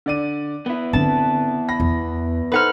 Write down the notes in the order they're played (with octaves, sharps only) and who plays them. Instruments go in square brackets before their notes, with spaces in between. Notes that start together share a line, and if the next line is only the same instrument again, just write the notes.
[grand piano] D3 D5 D#7
[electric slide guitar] B3 E4 [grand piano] B4
[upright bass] D3 C4 [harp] A5
[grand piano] B5 A#6
[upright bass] E2
[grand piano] D#4 A4 C5 [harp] B4 F#5 F6